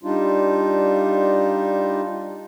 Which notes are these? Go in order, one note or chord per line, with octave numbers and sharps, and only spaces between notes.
G3 D4 D#4 F4